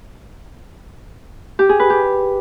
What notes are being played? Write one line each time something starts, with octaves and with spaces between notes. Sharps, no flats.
G4
G#4
B4
G4